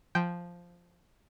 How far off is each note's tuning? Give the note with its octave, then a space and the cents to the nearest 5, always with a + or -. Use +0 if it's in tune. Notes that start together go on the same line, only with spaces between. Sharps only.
F3 +0 G5 +0